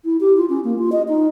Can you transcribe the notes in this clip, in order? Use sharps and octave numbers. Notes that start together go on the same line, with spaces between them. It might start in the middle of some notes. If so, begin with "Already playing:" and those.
E4
G4
F4
C#4
A#3
F4
D#5
D#4